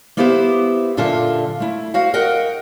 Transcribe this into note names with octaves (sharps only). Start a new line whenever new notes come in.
A#3 B3 E4 G4 B4 C5
F#2 A#2 D3 F4 E5 A5
A3 E4
F#4 C5 F5
A#4 D#5 F#5 G5